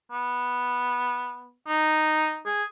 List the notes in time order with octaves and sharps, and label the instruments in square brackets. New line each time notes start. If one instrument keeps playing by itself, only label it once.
[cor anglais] B3
D#4
G#4